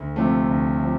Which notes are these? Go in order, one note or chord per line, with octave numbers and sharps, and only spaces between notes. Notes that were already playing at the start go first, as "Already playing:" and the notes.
Already playing: D2
C3 F3 A3
D2
C3 F3